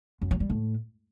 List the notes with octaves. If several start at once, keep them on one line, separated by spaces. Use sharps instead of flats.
F#2
F#3
G3
A2